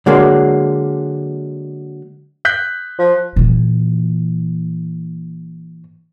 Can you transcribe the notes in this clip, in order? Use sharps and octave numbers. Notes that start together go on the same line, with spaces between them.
D3 F#3 G#3 A#3
F#6 G6 B6
F3
A#2 E3